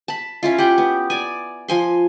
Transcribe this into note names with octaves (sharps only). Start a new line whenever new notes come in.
A5 B5
C#4 E4 F4
G4 F#5 G5
B3
D5 G#5
F3 G#5 C6